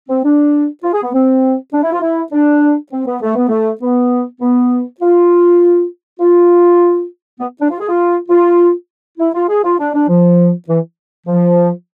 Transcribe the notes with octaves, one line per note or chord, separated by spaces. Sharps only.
C4
D4
F4
G#4
B3
C4
D4
E4
F4
E4
D4
C4
B3
A3
B3
A3
B3
B3
F4
F4
B3
D4
F4
G#4
F4
F4
E4
F4
G#4
F4
D4
D4
F3
E3
F3